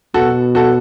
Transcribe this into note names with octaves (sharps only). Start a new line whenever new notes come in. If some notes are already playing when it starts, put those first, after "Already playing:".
B2 F#4 A4
F#4 A4